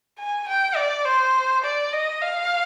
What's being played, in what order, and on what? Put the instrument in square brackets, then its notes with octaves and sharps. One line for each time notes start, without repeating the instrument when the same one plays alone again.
[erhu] G#5
G5
D5
C5
D5
D#5
F5